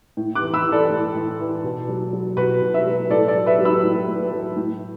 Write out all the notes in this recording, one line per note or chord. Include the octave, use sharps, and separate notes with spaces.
A2
D6 F#6
E3
B5 E6
E3
A4 D5
A2
A2
E3
B2
F#3
F#3
B2 F#4 B4
B2
B4 E5
F#3
A2 A4 D5
A4 D5
F#3
B4 E5
F#3
B5 E6
A2
A2
F#3
A2